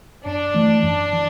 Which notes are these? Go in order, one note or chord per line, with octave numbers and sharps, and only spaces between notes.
F#2 D4
E3 A3
F#2
E3